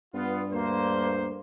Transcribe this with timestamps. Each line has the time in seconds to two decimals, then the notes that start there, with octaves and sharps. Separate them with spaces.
0.14 G2 B3 F4
0.52 D2 A#3 C5